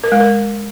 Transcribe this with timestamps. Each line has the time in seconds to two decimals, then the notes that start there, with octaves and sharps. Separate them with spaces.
0.04 A#4
0.12 G#3
0.20 A#4